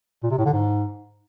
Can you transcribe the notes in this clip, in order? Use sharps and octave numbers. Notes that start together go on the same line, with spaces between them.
A#2
C3
A2
D3
G#2